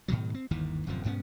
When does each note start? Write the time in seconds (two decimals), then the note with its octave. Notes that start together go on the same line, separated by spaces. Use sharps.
0.08 G#2 B2 D#3 F#3
0.34 C4
0.51 G1 D#2 D#3 E3
0.87 D1 F#2 C3 F3
1.04 B1 G2 B3 C#4